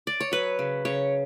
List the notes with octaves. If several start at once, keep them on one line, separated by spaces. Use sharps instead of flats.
D5
C#5
F#3 B4
C#3
C#3 C#5